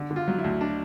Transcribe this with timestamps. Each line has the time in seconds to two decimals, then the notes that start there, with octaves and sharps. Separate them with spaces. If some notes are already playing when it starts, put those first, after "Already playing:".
Already playing: D3
0.11 D3
0.16 F4
0.28 F#3
0.38 E4
0.44 D2
0.61 D4